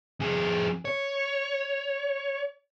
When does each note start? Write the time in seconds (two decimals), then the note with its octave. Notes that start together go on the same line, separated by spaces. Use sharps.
0.20 F2 G#4
0.85 C#5